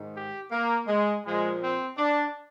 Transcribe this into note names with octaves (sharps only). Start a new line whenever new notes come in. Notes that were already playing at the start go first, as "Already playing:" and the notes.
Already playing: G#2 D#3
G4
A#3
G#3
A#2 F3 G#3
C4
D4